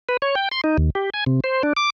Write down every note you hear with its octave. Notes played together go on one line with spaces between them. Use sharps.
B4
C#5
G5
C6
D#4
D#2
G4
G#5
C3
C5
D4
D6